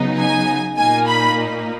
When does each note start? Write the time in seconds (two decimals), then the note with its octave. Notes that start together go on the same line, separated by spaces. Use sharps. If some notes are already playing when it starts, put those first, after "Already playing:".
Already playing: C#3 F#3 B3 D#4
0.18 G#5
0.77 A#2 A#3 D#4 G#5
1.07 B5